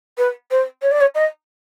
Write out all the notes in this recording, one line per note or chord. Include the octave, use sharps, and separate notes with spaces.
B4
C5
C#5
D5
C#5
D#5